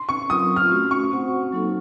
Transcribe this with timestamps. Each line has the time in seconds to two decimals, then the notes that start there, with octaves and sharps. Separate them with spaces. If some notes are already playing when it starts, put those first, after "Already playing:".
Already playing: C6
0.09 C#6
0.30 F#3 C4 F4 A#4 D#6
0.56 F6
0.71 A3 C#4 F#4
0.91 C#6
1.11 C4 F#4 C5 F#5
1.52 F#3 A#3 D#4 F#4 A4